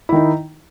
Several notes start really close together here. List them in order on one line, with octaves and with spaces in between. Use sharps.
E4 D#3 D#4